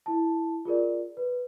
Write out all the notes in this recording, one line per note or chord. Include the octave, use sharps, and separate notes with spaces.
E4 A5
F4 G#4 A#4 D5
B4